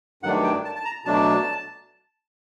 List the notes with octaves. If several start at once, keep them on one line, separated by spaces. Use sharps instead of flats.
G2 D#3 F#3 A3 D4 F#5
G5
A5
A5
A#5
B2 F#3 A3 D4 A5